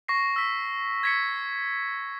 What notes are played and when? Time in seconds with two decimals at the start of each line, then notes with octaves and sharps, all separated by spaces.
0.08 C#6 A#6 C7
0.36 E6 B6
1.03 G#6 B6 C#7